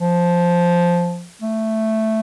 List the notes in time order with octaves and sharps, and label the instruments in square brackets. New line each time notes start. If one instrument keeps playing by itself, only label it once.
[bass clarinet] F3
A3